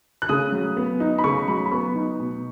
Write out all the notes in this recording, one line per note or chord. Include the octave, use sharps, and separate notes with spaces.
F#6
C#3 D#6
F#3
B3
D#4
B5
C#3 C#6
F#3 B5
B5
B3 C#6
D#4
B2